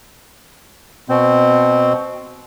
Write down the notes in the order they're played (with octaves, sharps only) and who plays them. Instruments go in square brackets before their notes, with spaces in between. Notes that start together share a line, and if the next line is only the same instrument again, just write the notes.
[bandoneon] B2 C4